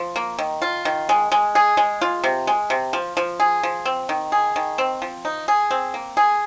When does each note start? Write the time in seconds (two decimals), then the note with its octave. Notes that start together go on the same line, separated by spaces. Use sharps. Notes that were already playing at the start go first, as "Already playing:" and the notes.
Already playing: F3
0.16 A#3
0.39 D#3
0.62 F4
0.85 D#3
1.09 G#3
1.32 G#3
1.55 G#4
1.77 G#3
2.01 F4
2.24 C3
2.47 G#3
2.70 C3
2.93 F3
3.17 F3
3.40 G#4
3.63 F3
3.85 C4
4.09 D#3
4.32 G#4
4.56 D#3
4.78 C4
5.02 F3
5.25 D#4
5.48 G#4
5.71 C4
5.94 A#3
6.17 G#4